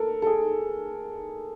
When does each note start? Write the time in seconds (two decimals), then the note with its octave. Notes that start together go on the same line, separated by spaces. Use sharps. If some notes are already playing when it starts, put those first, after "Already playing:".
Already playing: A4 A#4
0.22 A4
0.27 G#4